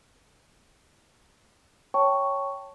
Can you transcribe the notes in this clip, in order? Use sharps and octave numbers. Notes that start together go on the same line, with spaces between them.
C#5 G5 A5 C#6